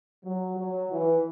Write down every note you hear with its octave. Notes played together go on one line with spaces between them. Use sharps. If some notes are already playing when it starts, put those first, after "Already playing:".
F#3
F#3
E3